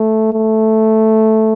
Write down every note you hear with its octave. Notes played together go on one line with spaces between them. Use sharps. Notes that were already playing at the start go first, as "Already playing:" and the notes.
Already playing: A3
A3